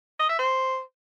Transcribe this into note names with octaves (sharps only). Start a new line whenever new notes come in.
D#5
E5
C5